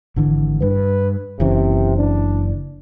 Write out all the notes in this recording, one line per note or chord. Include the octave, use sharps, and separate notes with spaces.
G#1 D3 E3
G2 B4
F#1 C3 E3 C#4
D4